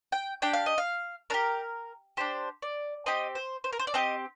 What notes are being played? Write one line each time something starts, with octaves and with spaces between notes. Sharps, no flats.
G5
D4 G4 G5
F5
D#5
F5
D4 G4 A#4
D4 G4 C5
D5
C4 G4 D#5
C5
C5
A#4
C5
D5
C4 G4 D#5